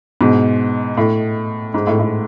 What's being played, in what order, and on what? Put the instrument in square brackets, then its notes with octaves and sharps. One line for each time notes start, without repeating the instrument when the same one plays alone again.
[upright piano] G#2 B2
A2
G#2
A2
A2